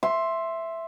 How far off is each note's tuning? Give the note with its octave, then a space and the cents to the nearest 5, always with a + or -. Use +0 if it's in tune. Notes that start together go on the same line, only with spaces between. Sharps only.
E5 +5 C6 +10